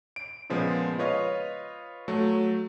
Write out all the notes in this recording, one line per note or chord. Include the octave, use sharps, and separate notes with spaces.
D7
A#2 C#3 F3 G#3 B3
F4 B4 C#5 D#5 F5
F#3 A3